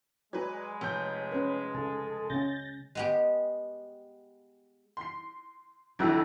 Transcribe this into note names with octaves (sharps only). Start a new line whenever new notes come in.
F#3 G#3 B4 D5 G#5
F1 C#5 B5 G6
C#4 B4
C#3 A4 A5
C#3 C#4 G6 A6 A#6
G#3 B3 G4
C6 C7
G1 F2 D3 E3 F#3 E6